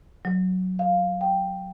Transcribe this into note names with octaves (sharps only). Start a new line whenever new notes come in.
F#3
F5
G5